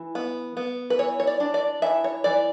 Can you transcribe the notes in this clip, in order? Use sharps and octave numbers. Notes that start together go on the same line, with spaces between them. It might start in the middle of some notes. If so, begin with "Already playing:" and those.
Already playing: E3
B3
B3
B4
E3 C#5
C#5
D5
D4
D5
E3 E5
C#5
E3 D5